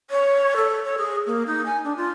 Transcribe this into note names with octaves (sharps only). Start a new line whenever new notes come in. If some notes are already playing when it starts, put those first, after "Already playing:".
C#5
A4
C#5
G#4
A#3
D#4
G#5
D4
F4